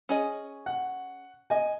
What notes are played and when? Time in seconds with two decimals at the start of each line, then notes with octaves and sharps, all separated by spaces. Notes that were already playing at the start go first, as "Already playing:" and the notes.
0.09 C#4 G#4 D#5
0.66 F#5
1.50 D#5 G#5